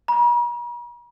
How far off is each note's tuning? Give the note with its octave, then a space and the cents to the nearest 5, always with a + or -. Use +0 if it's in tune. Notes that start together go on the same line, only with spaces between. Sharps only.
A#5 +45